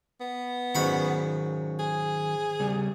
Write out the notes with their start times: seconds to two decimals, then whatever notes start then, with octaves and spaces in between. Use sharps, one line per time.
0.20 B3
0.75 G#2 D#3 F#3 C#4 B5 C#6
1.79 G#4
2.60 C#3 G3